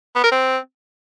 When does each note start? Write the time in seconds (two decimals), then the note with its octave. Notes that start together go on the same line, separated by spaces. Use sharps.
0.15 B3
0.24 A#4
0.32 C4